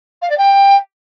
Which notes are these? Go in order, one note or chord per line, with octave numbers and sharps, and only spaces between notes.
F5
D5
G5